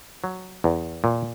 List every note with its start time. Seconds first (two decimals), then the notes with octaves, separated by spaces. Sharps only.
0.24 F#3
0.64 E2
1.04 A#2